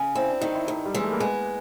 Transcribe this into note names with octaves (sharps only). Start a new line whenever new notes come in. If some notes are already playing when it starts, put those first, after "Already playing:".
Already playing: C#3
C4 E4
D4
D#3 D#4
E4
G2 D#4
G3
E3 G#3
A3
A#3
G#3 B3